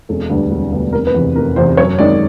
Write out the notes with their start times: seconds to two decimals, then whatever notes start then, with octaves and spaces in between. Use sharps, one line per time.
0.09 E1 A4
0.30 D2 D3 G3 B3
0.51 E1
0.72 D2 D3 G3 B3
0.93 F1 A#4
1.07 B4
1.15 E2 C3
1.36 F1 A#4
1.56 E2 C3 C5
1.77 F#2 C#5
1.99 D#3 G#3 D5